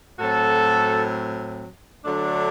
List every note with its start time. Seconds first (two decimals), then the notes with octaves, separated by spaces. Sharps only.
0.19 A2 F#3 C4 F#4 A4
2.04 D3 F#3 A3 D4